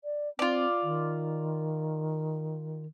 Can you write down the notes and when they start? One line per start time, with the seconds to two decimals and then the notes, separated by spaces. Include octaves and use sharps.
0.04 D5
0.39 C4 F4 D5
0.83 D#3